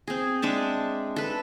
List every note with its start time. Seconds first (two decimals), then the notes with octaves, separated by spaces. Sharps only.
0.07 C4 G#4
0.42 G#3 D4 E5 A5
1.16 A4 B4